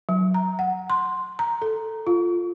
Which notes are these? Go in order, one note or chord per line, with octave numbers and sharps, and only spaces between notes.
F#3
A#5
F#5
C6
A#5
A4
F4